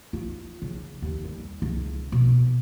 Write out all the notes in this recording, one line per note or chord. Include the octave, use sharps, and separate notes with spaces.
F4
C#3
D#2
G3
C#2
B2